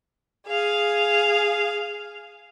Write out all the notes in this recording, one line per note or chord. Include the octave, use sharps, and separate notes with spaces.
G#4 F5